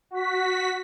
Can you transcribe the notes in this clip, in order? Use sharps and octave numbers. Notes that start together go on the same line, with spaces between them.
F#4 B6